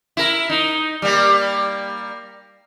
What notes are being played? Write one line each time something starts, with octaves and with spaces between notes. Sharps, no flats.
E4 A#4
D#4
G3 A#3